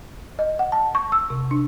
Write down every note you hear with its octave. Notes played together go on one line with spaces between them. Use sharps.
D#5
F#5
A5
C#6
E6
C3
D4